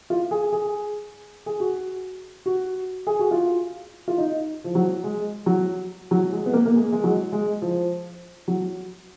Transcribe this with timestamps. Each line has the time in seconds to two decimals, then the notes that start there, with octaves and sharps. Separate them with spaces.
0.10 F4
0.31 G#4
0.52 G#4
1.46 G#4
1.60 F#4
2.46 F#4
3.07 G#4
3.20 F#4
3.31 F4
4.08 F4
4.18 D#4
4.64 F3
4.75 F#3
5.04 G#3
5.46 F#3
6.11 F#3
6.32 G#3
6.46 B3
6.53 A#3
6.66 A#3
6.76 G#3
6.92 G#3
7.04 F#3
7.32 G#3
7.62 F3
8.48 F#3